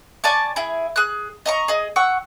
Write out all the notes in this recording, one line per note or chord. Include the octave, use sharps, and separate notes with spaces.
D5 G#5 A5 C#6
E4 G#4
G#4 F#6
D#5 A#5 C#6
G#4 D#5
F#5 C#6 E6